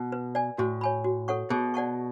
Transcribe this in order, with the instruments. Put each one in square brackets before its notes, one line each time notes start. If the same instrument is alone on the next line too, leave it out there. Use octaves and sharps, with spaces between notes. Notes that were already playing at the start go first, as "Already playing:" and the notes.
Already playing: [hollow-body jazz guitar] B2
[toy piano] B4
D5 G#5
[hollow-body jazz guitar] A2 [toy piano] F#4
[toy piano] C#5 G#5 B5
F#4
A4 C#5 F#5 C#6
[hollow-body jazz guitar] B2 [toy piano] G#4
[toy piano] D5 F#5 A5 C#6